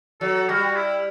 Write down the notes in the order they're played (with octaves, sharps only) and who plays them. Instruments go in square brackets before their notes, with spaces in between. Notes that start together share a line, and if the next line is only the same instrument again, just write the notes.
[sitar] F#3 [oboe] A4
[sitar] G3 [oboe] F#4
[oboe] E4